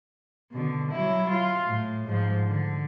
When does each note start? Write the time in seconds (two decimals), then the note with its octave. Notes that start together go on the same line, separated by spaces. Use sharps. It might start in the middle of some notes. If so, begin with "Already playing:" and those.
0.52 B2 D3
0.92 F#3 E4
1.31 F4
1.66 A2
2.07 G#2 F3
2.47 D3